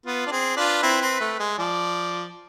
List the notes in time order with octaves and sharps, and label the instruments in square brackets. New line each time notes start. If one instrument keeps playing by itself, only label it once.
[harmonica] B3 [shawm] F4
[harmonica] D4
[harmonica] C4 [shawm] G#4
[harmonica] D4 F4 [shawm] B4
[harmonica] C4 E4
C4
A3
G#3
[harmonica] F3 [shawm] D5